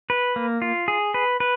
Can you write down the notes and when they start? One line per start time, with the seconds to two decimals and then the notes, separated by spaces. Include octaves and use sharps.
0.10 B4
0.36 A#3
0.62 F4
0.88 G#4
1.14 B4
1.40 B4